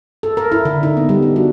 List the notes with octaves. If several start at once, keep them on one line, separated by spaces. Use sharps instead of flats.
A4
A#4
E4
D3
D#4
B3
G3
D4
F#4